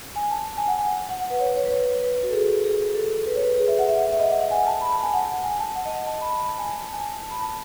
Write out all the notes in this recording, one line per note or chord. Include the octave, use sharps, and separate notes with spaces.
G#5
A5
G#5
F#5
G#5
F#5
F#5
B4
C#5
C#5
B4
C#5
B4
F#4
A4
G#4
G#4
A4
B4
C#5
B4
G#4
E5
F#5
E5
F#5
E5
D#5
F#5
F#5
G#5
A5
B5
A5
G#5
F#5
G#5
A5
F#5
D#5
D#5
A5
B5
B5
A5
G#5
A5
G#5
A5
B5
A5